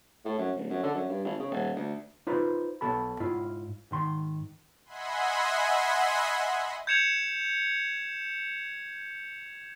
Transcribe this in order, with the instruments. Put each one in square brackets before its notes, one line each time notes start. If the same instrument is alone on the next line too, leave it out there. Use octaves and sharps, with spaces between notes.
[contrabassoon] A2
F#2
D1
F#2
D3
F#2
G2
G#1
C#3
D#1
D2
[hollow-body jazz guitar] D#4 F4 B4 C5
B1 B2 A4 A5 B5
G#2 E4 F4
G#2 D#3 C6
[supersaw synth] D#5 E5 F#5 G#5 B5 C6
[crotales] G6 G#6 C#7 E7 F7